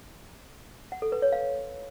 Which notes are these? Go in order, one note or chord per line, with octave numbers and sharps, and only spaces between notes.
F#5
A4
B4
C#5
F5